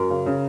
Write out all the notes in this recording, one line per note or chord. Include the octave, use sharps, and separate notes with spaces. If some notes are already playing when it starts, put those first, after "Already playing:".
Already playing: F#2 A#4
C#3
C#3